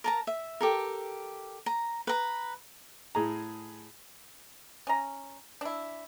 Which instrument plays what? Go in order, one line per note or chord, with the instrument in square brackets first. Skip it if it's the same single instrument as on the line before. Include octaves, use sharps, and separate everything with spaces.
[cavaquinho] A#4 A5 A#5
E5
G4 A4 A#4
A#5
B4 A#5
[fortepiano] A2 G#4 A#5
[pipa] C#4 A#5
D4 E4